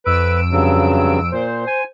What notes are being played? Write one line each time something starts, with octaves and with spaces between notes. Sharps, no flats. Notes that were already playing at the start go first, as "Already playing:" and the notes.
F2 B4 E6 D7
G2 C#3 F#3
A#2 C5
G#5